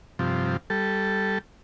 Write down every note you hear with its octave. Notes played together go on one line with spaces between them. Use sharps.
G2 C3 F3
G3 A4